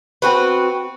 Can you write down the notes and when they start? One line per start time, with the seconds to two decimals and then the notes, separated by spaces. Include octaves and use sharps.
0.22 C4 F#4 B4